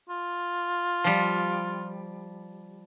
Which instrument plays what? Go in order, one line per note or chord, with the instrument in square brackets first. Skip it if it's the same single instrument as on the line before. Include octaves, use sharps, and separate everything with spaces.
[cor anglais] F4
[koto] F3 G3